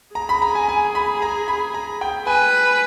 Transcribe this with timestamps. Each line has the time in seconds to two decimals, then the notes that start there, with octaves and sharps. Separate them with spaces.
0.15 G#4 A#5
0.29 B5
0.42 A#5
0.55 G#5
0.69 G#5
0.95 B5
1.22 A#5
1.48 B5
1.74 A#5
2.01 G5
2.27 B4 G#5